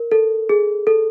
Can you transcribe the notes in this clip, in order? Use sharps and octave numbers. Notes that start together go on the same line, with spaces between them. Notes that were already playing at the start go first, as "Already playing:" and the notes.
Already playing: A#4
A4
G#4
A4